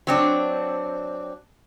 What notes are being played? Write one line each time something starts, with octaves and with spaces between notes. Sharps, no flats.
F#3 C4 D4